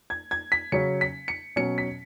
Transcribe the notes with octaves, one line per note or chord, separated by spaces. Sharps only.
G#6
G#6
B6
C#3 F#3 C#4 C#7
B6
C#7
B2 F#3 C#4 C#7
B6